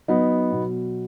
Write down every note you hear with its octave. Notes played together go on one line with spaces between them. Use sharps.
F#3 B3 D#4
B2